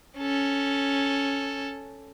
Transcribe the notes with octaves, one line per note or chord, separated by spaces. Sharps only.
C#4 A4